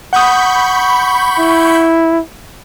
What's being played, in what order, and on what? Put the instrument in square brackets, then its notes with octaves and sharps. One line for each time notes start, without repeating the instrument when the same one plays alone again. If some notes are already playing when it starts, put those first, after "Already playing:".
[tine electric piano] F#5 D#6 [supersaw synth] B5 C#6 G6
[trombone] E4